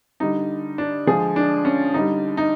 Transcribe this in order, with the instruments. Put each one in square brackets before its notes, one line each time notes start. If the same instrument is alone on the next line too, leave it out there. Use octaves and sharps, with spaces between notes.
[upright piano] D3 G3 D#4
D4
D3 F3 G#3 G#4
D4
C#4
D3 G3 D#4
D#4